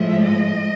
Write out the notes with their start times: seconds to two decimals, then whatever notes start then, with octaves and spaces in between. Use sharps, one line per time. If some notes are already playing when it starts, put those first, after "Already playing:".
Already playing: A2 F3 G#3 E5
0.23 D#5